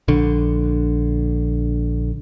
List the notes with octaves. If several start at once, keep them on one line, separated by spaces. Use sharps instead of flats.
A#1 D3